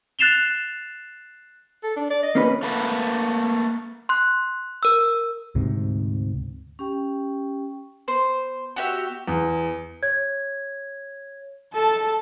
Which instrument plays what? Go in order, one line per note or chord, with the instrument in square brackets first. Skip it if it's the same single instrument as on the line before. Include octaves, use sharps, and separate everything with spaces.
[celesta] F#6 A6 C7 E7 F7 G7
[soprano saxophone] A4
D4
D5
D#5
[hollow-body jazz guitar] A#3 C#4 B4
[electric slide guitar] A3 A#3 B4
[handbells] C6 F#6
A#4 E6
[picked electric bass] D2 G#2 C3
[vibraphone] C#4 G4 G5
[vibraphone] B3 [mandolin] C5
[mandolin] F#4 G4 E5
[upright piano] E2
[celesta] C#5 G#6
[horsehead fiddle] A4 A5